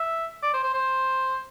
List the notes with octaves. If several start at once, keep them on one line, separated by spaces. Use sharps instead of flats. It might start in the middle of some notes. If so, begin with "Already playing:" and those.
Already playing: E5
D5
C5
C5
C5